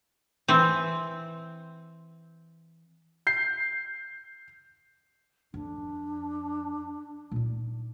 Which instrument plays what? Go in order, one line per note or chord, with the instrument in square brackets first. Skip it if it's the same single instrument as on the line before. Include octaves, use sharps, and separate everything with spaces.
[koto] E3 C4
[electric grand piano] G6 C7
[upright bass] F2 [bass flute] D4
[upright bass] A#2 D#4